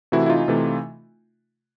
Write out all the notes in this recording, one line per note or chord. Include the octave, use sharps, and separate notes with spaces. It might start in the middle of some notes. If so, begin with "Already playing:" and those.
C3 E3 A3 E4 F#4
E4
D#4 F4
C3 E3 A3